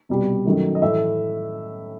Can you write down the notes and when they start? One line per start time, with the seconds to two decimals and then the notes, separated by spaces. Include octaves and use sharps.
0.09 C2 B2 G3
0.46 F#2 D#3 F#3 A3
0.75 D#5
0.81 A2 E3 A3 E5